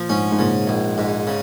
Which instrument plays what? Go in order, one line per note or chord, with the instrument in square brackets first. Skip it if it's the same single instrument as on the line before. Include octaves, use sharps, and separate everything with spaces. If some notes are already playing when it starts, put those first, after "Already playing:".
Already playing: [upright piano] A#2 [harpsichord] F3
[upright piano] G#2 [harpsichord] C#4
[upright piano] G#2
[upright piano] A#2 [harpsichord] C#3
[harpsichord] A#1
G#2
C#3